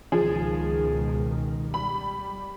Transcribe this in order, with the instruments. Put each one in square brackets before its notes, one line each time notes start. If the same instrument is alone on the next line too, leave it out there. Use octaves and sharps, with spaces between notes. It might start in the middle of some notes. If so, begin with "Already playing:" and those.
[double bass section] C#2 B2 D#3 [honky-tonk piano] F3 G#4
[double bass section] G3 [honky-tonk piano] B5